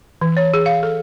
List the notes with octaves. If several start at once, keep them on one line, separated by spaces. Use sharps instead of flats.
E3
C#5
G#4
F5
A4